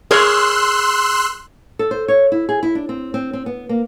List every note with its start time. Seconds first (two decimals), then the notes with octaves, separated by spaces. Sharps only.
0.11 G#4 A#4 C#5 C6 E6 F#6
1.79 A4
1.91 C5
2.08 C#5
2.32 E4
2.49 G#4
2.63 E4
2.75 D4
2.89 C4
3.14 C4
3.33 C4
3.46 B3
3.69 A#3